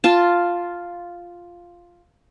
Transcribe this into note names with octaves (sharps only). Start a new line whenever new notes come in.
F4 A5